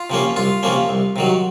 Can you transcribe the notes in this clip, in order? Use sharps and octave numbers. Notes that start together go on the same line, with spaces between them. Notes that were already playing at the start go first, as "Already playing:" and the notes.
Already playing: F4
C3 F3 A#3 C#4
C2 F4
C3 F3 A#3 C#4
C2
C3 D#3 F#3